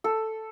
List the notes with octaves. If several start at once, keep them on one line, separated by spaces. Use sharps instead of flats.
A4